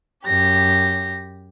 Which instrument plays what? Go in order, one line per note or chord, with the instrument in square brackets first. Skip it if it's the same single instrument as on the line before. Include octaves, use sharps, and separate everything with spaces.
[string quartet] F#2 G4 A#6